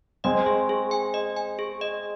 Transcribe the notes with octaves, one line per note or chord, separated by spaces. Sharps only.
G#3 C4 D#5
G#4
G#4
G#5
D#5
G#5
G#4
D#5